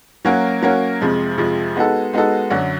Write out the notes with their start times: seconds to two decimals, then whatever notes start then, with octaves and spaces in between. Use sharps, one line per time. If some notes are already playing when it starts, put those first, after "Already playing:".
0.25 F#3 A#3 C#4 F#4 A#4
0.62 F#3 A#3 C#4 F#4 A#4
1.01 F2 C3 F3 G#3
1.38 F2 C3 F3 G#3
1.75 G#3 B3 D#4 F#4 A4
2.13 G#3 B3 D#4 F#4 A4
2.50 F#2 D3 F#3